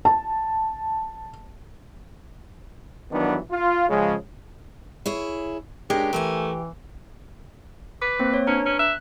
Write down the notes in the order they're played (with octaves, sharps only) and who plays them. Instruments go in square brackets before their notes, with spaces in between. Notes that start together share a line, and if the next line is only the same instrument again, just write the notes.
[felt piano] A5
[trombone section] G2 D#3 E3 F#3 B3 D4
F4
C#3 F3 G#3
[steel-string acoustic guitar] E4 G#4 C#5
[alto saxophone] G#3 [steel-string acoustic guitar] C#4 A#4 [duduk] D4 [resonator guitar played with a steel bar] G4
[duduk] E3 [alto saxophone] A3 [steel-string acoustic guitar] A#4 F5 G#5
[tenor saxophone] B4 [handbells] D6
[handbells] A#3 C4 C5
C#5
[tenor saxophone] C#4 [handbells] D4 B4 A#5
[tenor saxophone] C#4
[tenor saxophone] E5 [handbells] F#6